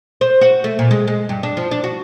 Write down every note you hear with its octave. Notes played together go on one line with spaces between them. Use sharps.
C5
F#4
A3
A#2
G#3
G#3
G2
D4
F3
D4
F#4